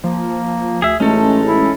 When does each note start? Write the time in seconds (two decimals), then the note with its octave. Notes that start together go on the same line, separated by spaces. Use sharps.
0.04 F3 A#3
0.82 D2 G#4 E5
1.00 A1 G#3 A3 C#4 D#4 A4
1.47 E4